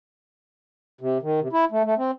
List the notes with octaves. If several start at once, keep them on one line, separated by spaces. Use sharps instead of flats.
C3
D#3
C3
E4
A3
A3
C4